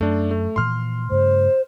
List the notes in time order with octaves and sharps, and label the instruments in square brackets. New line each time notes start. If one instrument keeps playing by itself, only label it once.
[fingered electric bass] F#2 [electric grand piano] A3 D4
[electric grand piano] A3
[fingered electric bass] A#2 E3 F3 [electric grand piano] C6 F6
[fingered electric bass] G2 C#3 A3 [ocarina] C5